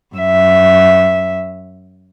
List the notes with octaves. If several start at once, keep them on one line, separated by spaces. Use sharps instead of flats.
F#2 E5